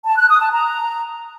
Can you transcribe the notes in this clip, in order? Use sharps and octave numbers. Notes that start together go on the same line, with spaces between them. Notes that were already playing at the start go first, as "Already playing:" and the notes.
A5
F#6
D#6
A5
A#5